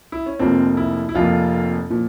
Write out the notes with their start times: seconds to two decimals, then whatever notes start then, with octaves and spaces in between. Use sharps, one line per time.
0.12 E4
0.26 C#4
0.39 F1 F2 C3 F3 A#3 C4
0.77 E4
1.09 E4
1.15 F1 F2 C3 F3 A#3 F4
1.90 A#2 F3